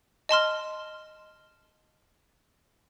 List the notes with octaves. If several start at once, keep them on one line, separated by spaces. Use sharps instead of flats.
D#5 A5 C6 F6